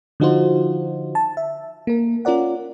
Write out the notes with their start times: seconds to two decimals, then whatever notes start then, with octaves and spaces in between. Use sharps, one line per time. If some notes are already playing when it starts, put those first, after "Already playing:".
0.20 D3 F3 D#4 F4 F#4 C5
1.15 A5
1.37 E5
1.87 A#3 A#4
2.25 C#4 F4 A#4 D5 F#5